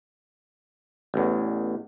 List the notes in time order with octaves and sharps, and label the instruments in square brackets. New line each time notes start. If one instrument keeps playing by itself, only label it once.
[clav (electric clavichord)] A1 E2